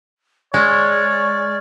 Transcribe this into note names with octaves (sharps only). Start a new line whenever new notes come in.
G#3 C#5 D5 C#6 F6 G#6